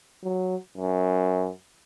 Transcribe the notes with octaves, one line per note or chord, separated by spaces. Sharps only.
F#3
F#2